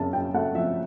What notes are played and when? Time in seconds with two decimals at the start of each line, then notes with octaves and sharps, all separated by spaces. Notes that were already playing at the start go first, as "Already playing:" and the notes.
Already playing: F#2 C#3 A5
0.13 C#3 G5
0.34 A3 F#5
0.54 F3 E5